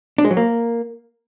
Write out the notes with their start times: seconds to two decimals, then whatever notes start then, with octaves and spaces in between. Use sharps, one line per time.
0.18 D4
0.25 G#3
0.31 F#3
0.37 A#3